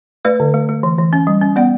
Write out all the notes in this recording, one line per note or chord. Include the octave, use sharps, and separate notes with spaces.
A3 B4 D5
D3
A3
A3
E3
E3
C#4
G3
C#4
B3 D5 F#5